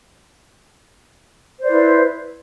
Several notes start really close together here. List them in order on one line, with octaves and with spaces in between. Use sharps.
C5 D5 B4 E4